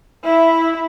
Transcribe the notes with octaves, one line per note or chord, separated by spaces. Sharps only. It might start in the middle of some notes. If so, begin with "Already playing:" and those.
E4 E5